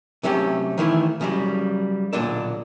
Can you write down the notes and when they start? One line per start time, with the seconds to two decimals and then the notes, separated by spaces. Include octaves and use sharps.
0.23 C3 F#3 A3 C#4 G4
0.78 D#3 E3 A3 E4
1.21 C#3 F#3 G3
2.13 B1 G2 A#2 D3 D4 A4